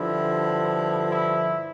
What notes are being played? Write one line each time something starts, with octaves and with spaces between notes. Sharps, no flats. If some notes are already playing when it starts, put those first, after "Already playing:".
Already playing: G2 D3 F3 E4
E4